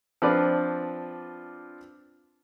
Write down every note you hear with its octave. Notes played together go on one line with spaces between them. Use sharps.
F3 C4 D4 F4 B4 D5